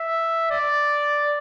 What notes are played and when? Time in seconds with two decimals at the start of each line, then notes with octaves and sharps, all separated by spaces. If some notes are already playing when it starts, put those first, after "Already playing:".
Already playing: E5
0.51 D5